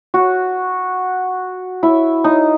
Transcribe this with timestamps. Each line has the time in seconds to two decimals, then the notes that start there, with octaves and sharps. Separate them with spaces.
0.14 F#4
1.83 E4
2.24 D#4